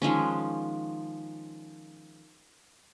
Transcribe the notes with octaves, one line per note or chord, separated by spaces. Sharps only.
D#3 F3 G#3 C#4